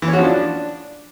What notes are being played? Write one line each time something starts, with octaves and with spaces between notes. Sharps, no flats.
E3
C#4
F#4
F3
D4